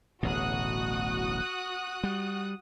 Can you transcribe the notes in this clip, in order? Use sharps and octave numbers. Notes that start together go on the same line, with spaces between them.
D1 A1 B2 F#4 D#6 F#6
G3